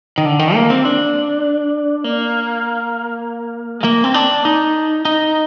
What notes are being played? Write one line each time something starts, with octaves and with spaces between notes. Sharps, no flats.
D#3
D3
D#3
A#3
C4
D4
A#3
G#3
A#3
C4
D4
D#4
D#4